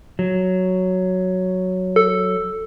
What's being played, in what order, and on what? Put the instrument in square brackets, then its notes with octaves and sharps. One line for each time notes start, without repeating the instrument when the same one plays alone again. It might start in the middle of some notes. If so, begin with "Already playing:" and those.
[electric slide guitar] F#3
[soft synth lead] A4